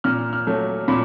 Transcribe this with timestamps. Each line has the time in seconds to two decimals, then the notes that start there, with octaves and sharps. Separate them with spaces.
0.04 A#2 F6
0.33 F6
0.47 F#3 A3
0.88 A#2 B5